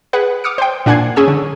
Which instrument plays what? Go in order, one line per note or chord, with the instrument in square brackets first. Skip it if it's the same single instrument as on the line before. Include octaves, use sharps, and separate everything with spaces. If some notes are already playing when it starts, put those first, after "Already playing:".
[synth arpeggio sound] G#4 B4 F#5
D6 D#6 F6 C#7
C5 G5
A#2 D4 F#5 G#5 G#6 C7
C#4 G#4 G#5 D#6 E6
D3